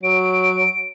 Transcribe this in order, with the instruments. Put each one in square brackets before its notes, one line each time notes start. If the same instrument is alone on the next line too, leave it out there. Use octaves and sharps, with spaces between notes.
[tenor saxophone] F#3 [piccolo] D7